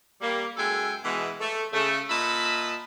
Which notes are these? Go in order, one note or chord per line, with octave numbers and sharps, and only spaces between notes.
G3 A#3
F#2 G#3 A4 E5 G5 G#5
B2 E3 G#3
A3
C#3 A3
A#2 D#5 E5 A5 B5